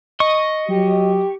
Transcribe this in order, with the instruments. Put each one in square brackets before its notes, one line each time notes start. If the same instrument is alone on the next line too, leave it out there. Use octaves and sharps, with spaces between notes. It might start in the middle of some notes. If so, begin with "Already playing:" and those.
[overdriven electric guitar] D#5 [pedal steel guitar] C#6
[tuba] F#3 [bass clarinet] G4